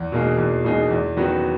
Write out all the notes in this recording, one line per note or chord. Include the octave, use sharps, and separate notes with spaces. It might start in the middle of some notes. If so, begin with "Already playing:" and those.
Already playing: E2
B2 A#3 D#4 G#4
E2
B2 A#3 D#4 G#4
E2
D#3 F#3 B3 F#4